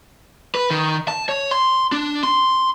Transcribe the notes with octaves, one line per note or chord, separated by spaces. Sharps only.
B4
D#3
A5
C#5
C6
D4
C6